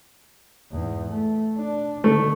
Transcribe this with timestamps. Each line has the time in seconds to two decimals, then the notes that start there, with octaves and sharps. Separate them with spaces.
0.71 E2 G#2
1.08 A3
1.57 D4
2.04 D3 D#3 A3